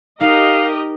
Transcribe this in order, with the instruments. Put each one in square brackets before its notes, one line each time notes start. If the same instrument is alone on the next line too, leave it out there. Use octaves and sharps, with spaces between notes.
[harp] D#4 F#6 [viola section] G4 A#4 D#5 [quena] F5